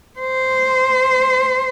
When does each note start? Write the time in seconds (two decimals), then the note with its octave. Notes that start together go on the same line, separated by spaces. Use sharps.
0.19 C5